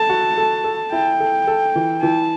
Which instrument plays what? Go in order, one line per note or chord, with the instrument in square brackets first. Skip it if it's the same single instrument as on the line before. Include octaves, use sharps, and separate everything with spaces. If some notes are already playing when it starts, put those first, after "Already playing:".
Already playing: [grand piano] A4 [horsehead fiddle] A5
[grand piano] F#4
A4
A4
[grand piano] E4 [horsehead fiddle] G5
[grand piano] A4
A4
E3
[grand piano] E3 [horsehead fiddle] A5